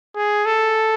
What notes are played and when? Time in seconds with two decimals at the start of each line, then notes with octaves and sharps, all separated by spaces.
0.16 G#4
0.46 A4